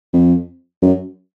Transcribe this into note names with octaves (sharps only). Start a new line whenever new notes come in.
F2
F#2